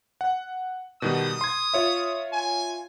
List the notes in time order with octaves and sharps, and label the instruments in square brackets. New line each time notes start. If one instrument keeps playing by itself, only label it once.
[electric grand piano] F#5
[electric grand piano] B2 D#3 G3 [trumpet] D#6
[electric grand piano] C6 G#6
F4 C#5 E5
[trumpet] G#5